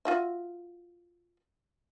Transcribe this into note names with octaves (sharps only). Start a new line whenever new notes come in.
F4 F#4 E5